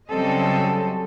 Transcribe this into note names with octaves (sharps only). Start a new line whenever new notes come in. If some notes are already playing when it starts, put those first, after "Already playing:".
C#3 F#3 G3 C4 A4 D#5